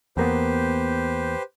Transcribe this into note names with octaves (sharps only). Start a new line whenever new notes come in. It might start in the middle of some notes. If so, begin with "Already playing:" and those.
E2 A#3 B3 G4 B4 C5